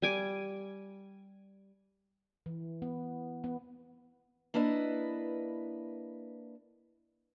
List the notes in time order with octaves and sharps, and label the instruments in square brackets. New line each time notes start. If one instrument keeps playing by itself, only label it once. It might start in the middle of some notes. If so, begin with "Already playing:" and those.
[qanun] G3 G#5 D6
[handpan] E3
B3
B3
[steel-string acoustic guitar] A#3 D4 E4 B4 D#5